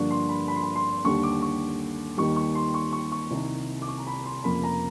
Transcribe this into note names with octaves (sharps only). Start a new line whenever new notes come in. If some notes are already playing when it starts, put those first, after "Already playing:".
Already playing: G2 D3 F3 A#3 D4 C#6
C6
B5
B5
C6
B5
C6
D#2 D3 G3 C#6
D6
C#6
D#2 D#3 G3 C#6
C#6
C6
C#6
C#6
C#6
C2 C3 D#3
D6
C#6
A#5
B5
C6
F1 F2 C#3 F3 A#3 B5
A#5